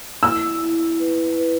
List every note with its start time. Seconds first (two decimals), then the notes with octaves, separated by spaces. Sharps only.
0.23 E4 E6
0.61 E4
1.00 B4
1.38 B4